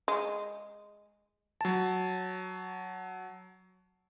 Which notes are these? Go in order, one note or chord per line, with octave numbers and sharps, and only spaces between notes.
G#3
F#3 A5